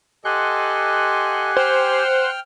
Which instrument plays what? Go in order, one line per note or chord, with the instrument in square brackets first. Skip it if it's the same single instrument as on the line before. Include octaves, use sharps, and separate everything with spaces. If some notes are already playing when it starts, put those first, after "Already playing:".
[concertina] G4 G#5 [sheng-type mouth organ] A4 D#5 [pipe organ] F#5 C6 F#6
[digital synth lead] C5 [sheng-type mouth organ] G5 F6